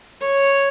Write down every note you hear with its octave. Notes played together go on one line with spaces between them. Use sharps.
C#5